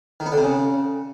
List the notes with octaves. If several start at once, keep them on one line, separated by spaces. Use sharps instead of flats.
D#3
B3
D3
C3
C#3